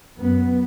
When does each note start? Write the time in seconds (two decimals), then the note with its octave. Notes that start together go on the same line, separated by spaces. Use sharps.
0.18 F#2 B3